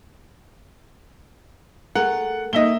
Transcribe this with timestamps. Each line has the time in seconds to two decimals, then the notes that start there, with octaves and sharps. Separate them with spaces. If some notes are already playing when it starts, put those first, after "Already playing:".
1.95 A3 G#4 A#4 F#5
2.53 A#3 D#4 D#5 E5 G7